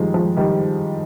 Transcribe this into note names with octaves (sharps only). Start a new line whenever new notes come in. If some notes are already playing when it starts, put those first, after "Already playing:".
Already playing: D#3 F3 G3 G#3
F3 G#3
D#3 G3